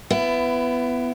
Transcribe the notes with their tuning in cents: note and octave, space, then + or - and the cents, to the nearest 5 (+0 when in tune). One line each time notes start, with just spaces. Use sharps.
B3 +15 E4 +30